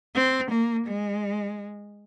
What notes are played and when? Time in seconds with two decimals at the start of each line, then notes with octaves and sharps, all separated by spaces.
0.15 C4
0.51 A#3
0.87 G#3